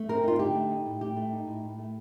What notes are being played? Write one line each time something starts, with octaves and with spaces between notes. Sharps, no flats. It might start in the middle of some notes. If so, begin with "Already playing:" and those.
Already playing: A3
C4 A#4
D#4 F4
D3 G4
A3
D#4
A2
A2 G4
A3
D#4
A2
A2
A3